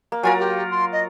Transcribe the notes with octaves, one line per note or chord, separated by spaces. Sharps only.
A#3
F#3 F4 A#4 G#5
G4
C6
D#5